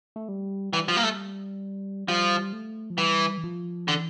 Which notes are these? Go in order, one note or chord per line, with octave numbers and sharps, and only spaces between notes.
A3
G3
E3 G3
F3
A#3
A3
F3 G3
A3
F3
E3 G3
E3
F3
D3 E3